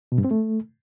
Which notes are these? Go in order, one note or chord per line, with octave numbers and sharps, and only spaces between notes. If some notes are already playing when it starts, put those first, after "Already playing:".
B2
G2
C4
A3